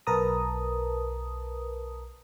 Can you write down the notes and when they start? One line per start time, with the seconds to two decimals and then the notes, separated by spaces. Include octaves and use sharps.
0.07 B1 A#4 B4 A5 A#5 D#6